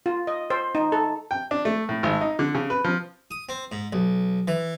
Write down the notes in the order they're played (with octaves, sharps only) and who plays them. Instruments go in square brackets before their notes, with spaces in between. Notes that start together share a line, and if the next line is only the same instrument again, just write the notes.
[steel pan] F4
D#5
C5
D#4
A4
[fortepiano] G5
D4
A3
A2
G#1
D#4
D3
C#3
B4
F3
[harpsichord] D#6
C4
G#2
B1
E3